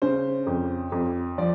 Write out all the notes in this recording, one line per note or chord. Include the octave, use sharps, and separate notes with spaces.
C#3 C5
F2
F2
F3 D5